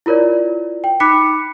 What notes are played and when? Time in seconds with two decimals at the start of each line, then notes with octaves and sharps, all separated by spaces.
0.06 E4 F4 A#4 C#5 D5
0.84 G5
1.00 D#4 B5 D6 F#6 B6 C#7